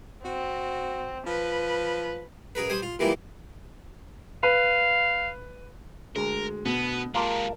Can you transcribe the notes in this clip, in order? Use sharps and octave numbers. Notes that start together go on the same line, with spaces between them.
C4 F#4
F3 B4
F#2 G#4 A#4 B4
G3 C5 G#5 D#6
F4
A#2 E3 G3 G#3 A#3 E4
B4 F5
D2 G#3 A#4
B2 B3
G#3 A#3 F4 G4 A#4 A5